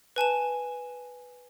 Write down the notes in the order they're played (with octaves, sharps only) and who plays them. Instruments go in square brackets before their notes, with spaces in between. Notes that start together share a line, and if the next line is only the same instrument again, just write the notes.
[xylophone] B4 G#5 A5 E7